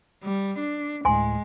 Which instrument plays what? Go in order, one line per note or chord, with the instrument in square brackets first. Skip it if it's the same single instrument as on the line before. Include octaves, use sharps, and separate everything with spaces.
[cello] G3
D4
[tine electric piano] D2 A2 [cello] G#3 [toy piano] G#5 C6